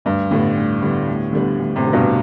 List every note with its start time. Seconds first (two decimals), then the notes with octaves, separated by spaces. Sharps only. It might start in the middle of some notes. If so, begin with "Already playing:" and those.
0.05 D2 G2
0.31 A2 D3 G3 B3 D4
0.57 D2
0.82 D3 G3 B3 D4
1.08 D2
1.33 D3 G3 B3 D4
1.59 D2
1.76 A2 C3
1.84 D3 G3 B3 D4
1.93 G2 B2